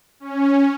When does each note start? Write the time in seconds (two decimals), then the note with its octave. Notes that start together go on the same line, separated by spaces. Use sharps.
0.20 C#4